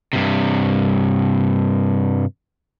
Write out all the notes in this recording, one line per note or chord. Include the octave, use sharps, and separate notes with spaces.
G2 C3